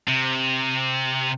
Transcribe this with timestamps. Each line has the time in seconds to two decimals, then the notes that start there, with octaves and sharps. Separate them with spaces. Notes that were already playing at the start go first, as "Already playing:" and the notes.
0.08 C3